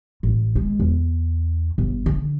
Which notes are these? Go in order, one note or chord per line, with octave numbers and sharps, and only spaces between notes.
A1
G#3
E2
G1
D3